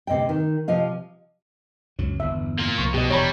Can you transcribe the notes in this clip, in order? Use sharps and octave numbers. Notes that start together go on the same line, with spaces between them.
D2 C3 D#5 E5 G5
D#3
C3 F3 D#5 F5
C#2 F#2 F#3
G1 E2 E5
A#3 F4
C2 F3 C#6
B2 G4 D#5
E1 E2 G3 C#5 A#5 B5